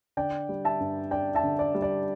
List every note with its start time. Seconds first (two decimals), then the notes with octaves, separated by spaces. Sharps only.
0.17 D3 D5 G5
0.49 G3
0.65 E5 A5
0.80 G2
1.11 D4 D5 G5
1.35 E5 A5
1.43 D3
1.59 D5
1.75 G3
1.82 D5